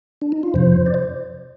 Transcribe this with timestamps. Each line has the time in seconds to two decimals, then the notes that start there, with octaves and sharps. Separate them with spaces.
0.22 D4
0.32 D#4
0.43 F4
0.54 F2 C3 F3 C5
0.86 D5
0.94 C5